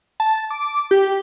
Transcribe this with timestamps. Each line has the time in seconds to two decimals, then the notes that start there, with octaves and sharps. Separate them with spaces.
0.20 A5
0.50 D6
0.91 G4